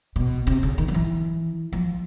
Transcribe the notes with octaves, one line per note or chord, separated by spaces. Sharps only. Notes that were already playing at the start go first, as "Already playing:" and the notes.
B2
C3
C#3
D#3
F3
E3
F3